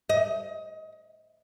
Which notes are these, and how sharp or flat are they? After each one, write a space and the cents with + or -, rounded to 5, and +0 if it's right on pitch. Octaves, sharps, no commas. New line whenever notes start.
D#5 +25